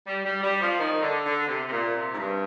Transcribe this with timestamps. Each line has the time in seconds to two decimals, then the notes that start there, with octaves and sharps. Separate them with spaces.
0.06 G3
0.24 G3
0.42 G3
0.60 F3
0.77 D#3
1.00 D3
1.24 D3
1.48 C3
1.66 C3
1.70 A#2
1.94 C3
2.11 G#2
2.18 G2